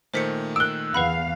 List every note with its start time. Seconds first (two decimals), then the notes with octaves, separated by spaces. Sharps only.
0.14 A#2 D#3 A3 C5 B6 C#7
0.56 A#4 E6 F#6 D7
0.94 E2 B4 F5 F#5 B5